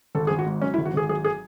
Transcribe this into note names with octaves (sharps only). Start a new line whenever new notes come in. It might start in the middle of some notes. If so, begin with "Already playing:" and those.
G#1 A4
G#4
G#1
F#4
G#2
F#3 C#4
E4
G#1
F#4
G#1 G#4
F#3 G#4
G#4